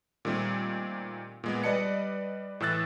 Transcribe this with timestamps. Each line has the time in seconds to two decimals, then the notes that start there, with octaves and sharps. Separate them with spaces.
0.25 A#2 D#3 G3 A3 C4
1.44 A#2 G#3 B3
1.64 G3 B4 D5 D#5 A5 C#7
2.60 A2 E3 A4 E6 F#6 A6